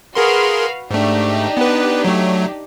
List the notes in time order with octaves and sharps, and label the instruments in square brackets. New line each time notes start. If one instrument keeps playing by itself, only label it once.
[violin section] F#4 B4 F5 [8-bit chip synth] G#4 A#4 C6
[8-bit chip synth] G#2 A3 [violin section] D4 D#4 G4
[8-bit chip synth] B3 B4
F#3 A3